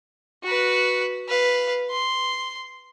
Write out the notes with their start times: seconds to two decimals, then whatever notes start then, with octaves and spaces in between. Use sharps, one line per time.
0.44 F#4 B4
1.29 B4 F5
1.91 C6